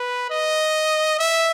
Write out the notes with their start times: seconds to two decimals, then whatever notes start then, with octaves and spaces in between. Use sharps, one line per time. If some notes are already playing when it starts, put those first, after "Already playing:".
Already playing: B4
0.30 D#5
1.20 E5